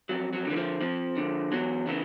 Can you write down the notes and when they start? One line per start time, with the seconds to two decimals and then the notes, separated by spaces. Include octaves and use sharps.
0.09 F2 F#3
0.33 F#3
0.45 D3 E3
0.56 F3
0.81 F2 F3
1.16 D3
1.52 E2 F#3
1.87 C#3 E3